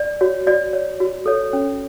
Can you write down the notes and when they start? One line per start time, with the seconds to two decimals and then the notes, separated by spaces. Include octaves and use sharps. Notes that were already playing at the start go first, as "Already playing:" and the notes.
Already playing: D5
0.21 F#4 C#5
0.47 F#4 D5
0.73 C#5
1.00 F#4
1.26 A4 C#5
1.53 C#4